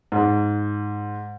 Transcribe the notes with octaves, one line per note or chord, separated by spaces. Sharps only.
G#2